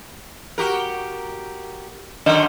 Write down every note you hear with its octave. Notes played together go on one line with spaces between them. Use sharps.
F#4 G4 A#4
F#2 D3 D#3 D#5